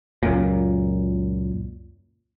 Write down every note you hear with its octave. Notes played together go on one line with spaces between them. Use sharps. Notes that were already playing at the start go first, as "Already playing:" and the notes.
C#2 F#2 A#2